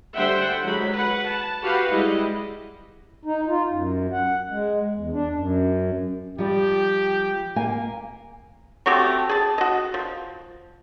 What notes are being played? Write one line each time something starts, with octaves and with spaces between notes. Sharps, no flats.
D3 G3 C5 E5 F#5 G5
F#3 G#3 B5
B4 F#5
A5
F#4 G4 B4 F5 F#5
G3 G#3 E4 D#5
D#4
F4
F#2
F#5
G#3
E2
D4
F#2
F3 G3 G4
A#3 F5 G#5
A3 C4 F#4 G4
G#4 A5
F#4 D#5
F3